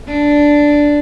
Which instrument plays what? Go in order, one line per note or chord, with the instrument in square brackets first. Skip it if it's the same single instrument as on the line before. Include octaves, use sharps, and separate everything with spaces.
[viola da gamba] D4